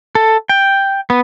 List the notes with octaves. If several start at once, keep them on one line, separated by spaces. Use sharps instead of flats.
A4
G5
B3